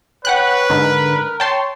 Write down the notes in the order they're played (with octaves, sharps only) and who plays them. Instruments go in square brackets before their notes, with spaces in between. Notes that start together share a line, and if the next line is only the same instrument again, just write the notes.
[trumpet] B4 [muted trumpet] C#5 [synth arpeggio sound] F#5 G5 F#6
[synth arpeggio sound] G#2 D3 [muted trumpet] A#4
[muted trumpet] C#5 [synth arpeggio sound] G5 A5 C6